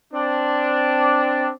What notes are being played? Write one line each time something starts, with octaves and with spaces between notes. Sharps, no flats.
C4 D4